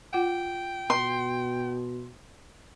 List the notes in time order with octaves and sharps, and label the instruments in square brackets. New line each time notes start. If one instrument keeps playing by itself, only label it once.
[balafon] F4 F#5 [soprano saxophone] G5
[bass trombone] B2 [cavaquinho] C6